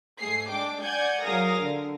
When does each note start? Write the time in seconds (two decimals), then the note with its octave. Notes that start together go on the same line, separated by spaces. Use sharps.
0.20 G#2 A3 G#4 C7
0.50 G#3 D4 G5 D6
0.83 D5 F#5 G#5 G6 G#6
1.24 F#3 G#4 A#4 F5 D#6 A#6
1.60 D3